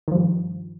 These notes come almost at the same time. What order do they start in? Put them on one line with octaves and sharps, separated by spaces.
D#3 F3 G2